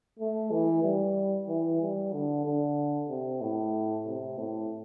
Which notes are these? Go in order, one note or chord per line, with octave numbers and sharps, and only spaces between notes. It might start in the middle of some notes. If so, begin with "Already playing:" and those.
A3
E3
G3
E3
G3
D3
D3
C3
A2
C3
A2